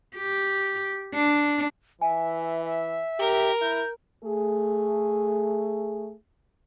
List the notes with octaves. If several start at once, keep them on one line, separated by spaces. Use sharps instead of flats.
G4
D4
E3 E5 G#5
E5
G4 A#4
E4 G6
A3 G#4